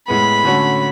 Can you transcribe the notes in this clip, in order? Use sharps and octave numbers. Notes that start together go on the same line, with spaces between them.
A2 G#3 B3 B5
D3 A3 C#4 F#4